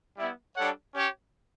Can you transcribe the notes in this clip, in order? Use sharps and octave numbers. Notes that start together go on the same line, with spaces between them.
G3 B3 E4
G3 D4 A4 C#5 F#5
C#4 G4 C#5